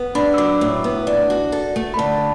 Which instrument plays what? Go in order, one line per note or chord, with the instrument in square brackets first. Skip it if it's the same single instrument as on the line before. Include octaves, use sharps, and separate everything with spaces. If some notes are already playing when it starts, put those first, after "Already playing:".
Already playing: [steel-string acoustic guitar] B3
[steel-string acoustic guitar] D4 [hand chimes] B5
[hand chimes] E6
[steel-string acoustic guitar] F#3 [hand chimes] D6
[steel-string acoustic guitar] A2
B3
D4
F#4
A4
A3
[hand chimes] B5
[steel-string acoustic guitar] D3 [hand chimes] A5